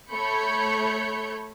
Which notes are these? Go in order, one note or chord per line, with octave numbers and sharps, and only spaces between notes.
A3 C#5 B5 G6 C#7